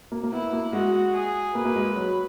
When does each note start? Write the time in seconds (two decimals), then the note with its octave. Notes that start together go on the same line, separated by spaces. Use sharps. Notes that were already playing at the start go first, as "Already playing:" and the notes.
0.12 A#3
0.23 A#3
0.32 B3 E4
0.53 A#3
0.73 G#3 F#4
1.14 G#4
1.55 A#3 B4
1.65 A#3
1.76 G#3
1.96 F#3